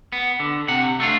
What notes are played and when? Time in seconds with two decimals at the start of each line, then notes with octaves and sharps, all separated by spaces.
0.12 B3
0.40 D3
0.68 C3 F#5
1.00 A3 D4 F4